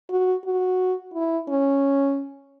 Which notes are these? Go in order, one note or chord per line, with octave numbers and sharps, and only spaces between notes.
F#4
F#4
E4
C#4